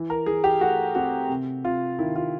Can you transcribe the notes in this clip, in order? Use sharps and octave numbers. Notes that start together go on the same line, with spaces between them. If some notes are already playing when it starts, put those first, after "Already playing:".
Already playing: E3
A#4
E3 G#4
G4
A3 F#4
C4 F#4
C3
C3 F4
D#3 E4
F4